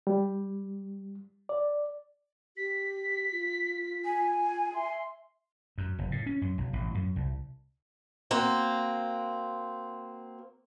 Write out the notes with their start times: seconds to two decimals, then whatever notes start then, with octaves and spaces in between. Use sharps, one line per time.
0.07 G3
1.49 D5
2.57 G4 B6
3.32 F4
4.05 G#5
4.74 E5 C6
5.78 F#2
5.99 F#1
6.12 A2
6.26 C#4
6.42 F#2
6.58 B1
6.73 A1
6.95 F#2
7.16 C2
8.31 A#3 C4 F#4